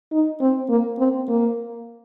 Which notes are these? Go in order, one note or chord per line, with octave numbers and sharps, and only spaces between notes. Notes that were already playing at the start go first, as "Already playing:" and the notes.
D#4
C4
A#3
C4
A#3